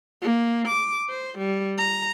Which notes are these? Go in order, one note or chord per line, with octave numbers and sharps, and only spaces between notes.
A#3
D6
C5
G3
A#5